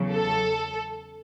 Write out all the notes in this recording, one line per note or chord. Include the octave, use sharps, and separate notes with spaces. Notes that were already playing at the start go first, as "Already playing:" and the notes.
Already playing: E2 C#3 F#3
A4